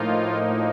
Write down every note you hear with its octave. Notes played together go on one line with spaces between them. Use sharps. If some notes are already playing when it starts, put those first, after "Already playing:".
Already playing: A2 F3 A#3 D#4 F4